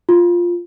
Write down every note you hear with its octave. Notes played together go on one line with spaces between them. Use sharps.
F4